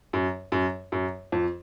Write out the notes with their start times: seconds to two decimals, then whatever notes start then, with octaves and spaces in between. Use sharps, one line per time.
0.13 F#2
0.52 F#2
0.92 F#2
1.32 F2